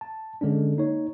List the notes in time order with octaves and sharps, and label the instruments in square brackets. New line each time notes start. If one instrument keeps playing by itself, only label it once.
[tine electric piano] A5
D3 G#3 C#4 D4
A#3 D#4 C#5